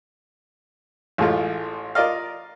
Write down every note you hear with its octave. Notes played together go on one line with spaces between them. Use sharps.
A1 A2 G#3 A3 F4
F4 A#4 D5 D#5 F5